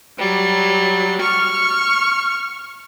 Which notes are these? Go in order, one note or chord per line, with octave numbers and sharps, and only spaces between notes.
F#3 G3
C#6 F6